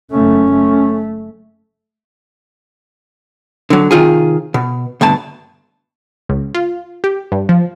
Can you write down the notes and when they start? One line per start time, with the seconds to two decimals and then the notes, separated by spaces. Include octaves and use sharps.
0.11 F#1 A3 C#4
0.51 A3
3.70 D3 F#3
3.91 C3 D#3 F4 G#4
4.54 B2
5.01 D2 G2 B2 A5
6.29 C#2
6.55 F4
7.04 G4
7.32 G2
7.49 F3